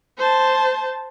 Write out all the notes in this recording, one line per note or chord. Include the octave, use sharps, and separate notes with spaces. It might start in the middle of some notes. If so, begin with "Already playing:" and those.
C5 A5